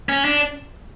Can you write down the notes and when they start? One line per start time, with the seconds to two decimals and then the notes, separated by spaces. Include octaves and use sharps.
0.09 C#4
0.25 D4